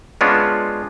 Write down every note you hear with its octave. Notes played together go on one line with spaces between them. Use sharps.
G#3 B3 C#4 D4 F4